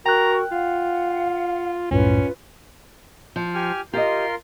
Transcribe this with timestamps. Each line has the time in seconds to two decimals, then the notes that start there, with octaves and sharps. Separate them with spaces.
0.06 F#4 A#4 G5 A#5 C#6 F#6
0.51 F4 F5 F#5
1.91 C2 F#2 A2 C#4 F4 B4
3.36 F3
3.55 G4 G#5 F6
3.93 F4 G4 A#4 D#5 C6